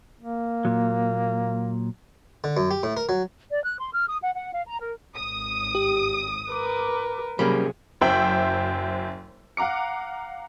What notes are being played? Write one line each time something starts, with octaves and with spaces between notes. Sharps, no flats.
A#3
A#2 F#3
D3
F#2
G4
A2
A#4
F#3
D5
F#6
C6
F6
D#6
F#5
F#5
F5
A#5
A#4
G#1 D#6
G4
A#4 B4 D6
C3 F#3 G3 A#3 C#4 G#4 B5
F#1 F#2 C5 E5 G5 F#7
F5 F#5 A#5 D6 C#7